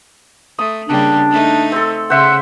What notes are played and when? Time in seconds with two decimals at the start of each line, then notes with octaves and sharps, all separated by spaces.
0.59 A3 D#6
0.88 C#3 G3 A#3 D4
1.30 A3 D#4
1.72 C4 A4
2.10 C#3 C5 E5 F#5 C6